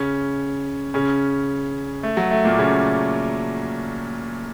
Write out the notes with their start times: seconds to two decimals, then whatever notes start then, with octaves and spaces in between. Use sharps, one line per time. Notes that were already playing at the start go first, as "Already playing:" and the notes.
Already playing: C#3 C#4
0.94 C#3 C#4
2.03 A3
2.17 F#3
2.31 A3
2.44 A#2 A#3
2.59 C#3 C#4